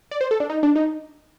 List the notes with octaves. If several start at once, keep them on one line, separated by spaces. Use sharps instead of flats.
D5
C5
A4
D4
D#4
D4
D#4